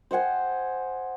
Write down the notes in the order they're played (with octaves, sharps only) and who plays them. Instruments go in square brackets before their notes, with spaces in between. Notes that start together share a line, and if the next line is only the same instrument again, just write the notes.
[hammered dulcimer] C5 D#5 F#5 G#5